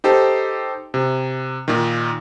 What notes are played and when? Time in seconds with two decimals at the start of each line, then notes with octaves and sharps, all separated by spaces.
0.04 D#4 G4 A4 C5
0.94 C3
1.68 A#2 D#3